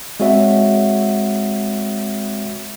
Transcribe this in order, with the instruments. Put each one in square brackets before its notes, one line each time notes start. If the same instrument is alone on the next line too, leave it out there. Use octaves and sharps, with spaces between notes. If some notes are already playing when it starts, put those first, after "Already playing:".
[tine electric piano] G#3 C4 F#4 C#5 E5 F#5